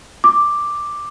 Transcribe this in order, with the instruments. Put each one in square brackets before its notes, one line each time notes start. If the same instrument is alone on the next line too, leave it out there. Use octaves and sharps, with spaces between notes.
[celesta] D6